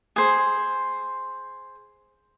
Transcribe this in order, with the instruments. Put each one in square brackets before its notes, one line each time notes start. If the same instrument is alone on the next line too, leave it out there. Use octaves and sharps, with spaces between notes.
[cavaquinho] G#4 C5